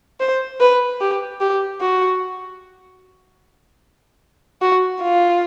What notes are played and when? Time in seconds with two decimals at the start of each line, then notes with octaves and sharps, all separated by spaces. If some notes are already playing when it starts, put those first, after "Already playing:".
0.20 C5
0.60 B4
1.01 G4
1.41 G4
1.81 F#4
4.62 F#4
5.02 F4